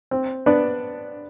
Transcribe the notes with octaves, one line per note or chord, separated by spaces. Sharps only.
C4
B3 D4